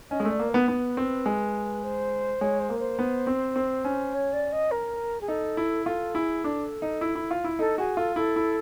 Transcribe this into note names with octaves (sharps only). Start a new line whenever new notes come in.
C#4 D#5
G#3
A3
D5
A#3
B3 B4
B3
C4
G#3
C5
G#3 C#5
C5
A#3
C5
B3
C4
C4
C#4
C#5
D5
D#5
A#4
G#4
D#4 A4
E4
F4 A4
E4 G#4
D4 A4
D#4
E4
E4
F4
E4
D#4 A4
F#4 G#4
F4 A4
E4 A4
E4